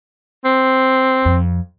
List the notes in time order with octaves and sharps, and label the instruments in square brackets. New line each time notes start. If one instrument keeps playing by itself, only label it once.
[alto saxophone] C4
[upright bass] F2